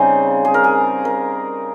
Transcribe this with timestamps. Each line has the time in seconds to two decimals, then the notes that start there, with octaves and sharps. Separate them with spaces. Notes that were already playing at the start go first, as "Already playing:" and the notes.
Already playing: C#3 G3 C4 D#4 C5
0.45 G#4
0.54 A#4
0.64 G#4
1.05 A#4